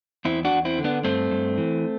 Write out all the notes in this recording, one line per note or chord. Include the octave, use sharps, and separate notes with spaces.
E2 C4 E4
D4 F#4
E2
C4 E4
D3
B3 D4
G2 A3 C4
G2
E3